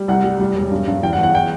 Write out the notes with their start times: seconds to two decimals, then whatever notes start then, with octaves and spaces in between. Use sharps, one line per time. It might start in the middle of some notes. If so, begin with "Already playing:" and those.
Already playing: G3
0.08 C2 F#5
0.24 G3
0.40 G3
0.55 E1
0.71 G2
0.88 G2
1.03 E2 G5
1.13 F#5
1.18 E2
1.23 F#5
1.35 G5